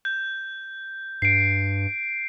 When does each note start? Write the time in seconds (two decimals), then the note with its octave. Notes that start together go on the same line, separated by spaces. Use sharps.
0.05 G6
1.22 G2 C7 D7